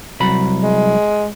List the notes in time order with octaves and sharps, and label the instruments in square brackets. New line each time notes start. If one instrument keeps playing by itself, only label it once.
[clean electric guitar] C2 F#3 B5
[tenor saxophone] G#3